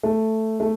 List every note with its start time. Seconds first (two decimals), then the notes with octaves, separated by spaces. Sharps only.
0.03 A3
0.60 A3